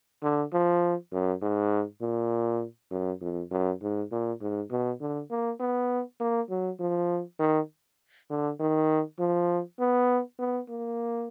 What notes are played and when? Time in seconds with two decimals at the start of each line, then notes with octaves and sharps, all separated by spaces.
0.23 D3
0.53 F3
1.12 F#2
1.42 G#2
2.01 A#2
2.91 F#2
3.21 F2
3.51 F#2
3.82 G#2
4.12 A#2
4.41 G#2
4.71 B2
5.01 D3
5.30 A#3
5.60 B3
6.20 A#3
6.49 F#3
6.80 F3
7.39 D#3
8.30 D3
8.60 D#3
9.19 F3
9.79 B3
10.39 B3
10.69 A#3